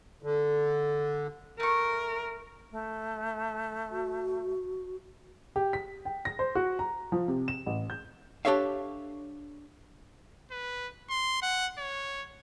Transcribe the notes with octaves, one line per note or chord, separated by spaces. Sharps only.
D3
A3 A#4 C#6
A3
F#4
G4
B6
G5
A#6
C5
F#4
A#5
F3
C3
E7
A1
G6
D4 G4 A4 C#5 E5 F5
B4
C6
F#5
C#5